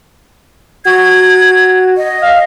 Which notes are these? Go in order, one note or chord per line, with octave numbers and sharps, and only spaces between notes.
F#4 G#6
D#5
F5